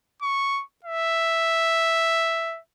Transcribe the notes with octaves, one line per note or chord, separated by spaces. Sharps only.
C#6
E5